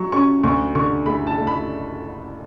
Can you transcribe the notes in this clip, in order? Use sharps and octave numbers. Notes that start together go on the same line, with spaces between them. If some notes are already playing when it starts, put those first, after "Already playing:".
Already playing: F#3 C#6
C#4 C#6
D2 C#6
D3 C#6
A3 B5
A5
A3
B5